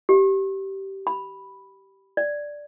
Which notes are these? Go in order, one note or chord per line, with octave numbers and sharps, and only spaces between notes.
G4
B5
D5